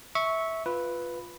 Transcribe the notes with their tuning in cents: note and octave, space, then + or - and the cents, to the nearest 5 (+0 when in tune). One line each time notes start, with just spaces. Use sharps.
E5 -15 C#6 +0
F4 +0 B4 +0